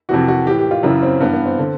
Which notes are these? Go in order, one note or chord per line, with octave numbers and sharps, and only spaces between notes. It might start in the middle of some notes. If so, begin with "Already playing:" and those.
F2 C3 E3 F#4
F#4
A2 E3 G4
G4
F4
F#2 C#3 E3 E4
C4
G2 E3 B3
B3
C4
D3